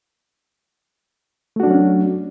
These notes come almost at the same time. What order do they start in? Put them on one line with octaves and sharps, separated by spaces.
A3 F#4 D4 F#3 C#4